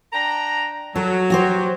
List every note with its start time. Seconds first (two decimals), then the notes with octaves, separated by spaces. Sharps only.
0.13 D4 G5 A#5
0.95 F#3 A4
1.30 F#4 G4 C5